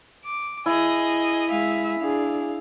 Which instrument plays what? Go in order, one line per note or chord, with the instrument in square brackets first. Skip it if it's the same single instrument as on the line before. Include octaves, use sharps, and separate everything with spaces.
[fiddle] D6
[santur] E4 [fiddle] G#4 D#5
[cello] G#3 E5 [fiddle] G#4 F5
[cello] D4 G#4 [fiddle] F5